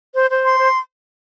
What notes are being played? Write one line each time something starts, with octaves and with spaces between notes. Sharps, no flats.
C5
C5
C6
C5